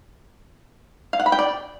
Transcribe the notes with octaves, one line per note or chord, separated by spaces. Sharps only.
F5
F#5
B5
G5
D5